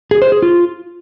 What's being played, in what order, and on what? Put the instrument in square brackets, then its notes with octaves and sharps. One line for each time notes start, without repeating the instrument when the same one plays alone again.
[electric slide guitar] G#4
C5
G#4
F4